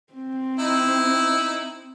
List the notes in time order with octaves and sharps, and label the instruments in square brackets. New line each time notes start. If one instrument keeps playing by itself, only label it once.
[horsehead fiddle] C4
[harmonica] D#4 E4